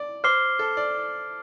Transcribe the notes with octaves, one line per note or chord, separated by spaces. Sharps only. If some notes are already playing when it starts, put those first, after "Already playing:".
Already playing: D5
C5 D6 F6 C7 G7
A4
D5